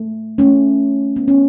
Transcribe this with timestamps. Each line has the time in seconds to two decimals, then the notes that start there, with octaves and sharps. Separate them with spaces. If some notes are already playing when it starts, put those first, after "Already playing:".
Already playing: A3
0.38 A3 C#4
1.16 B3
1.28 C#4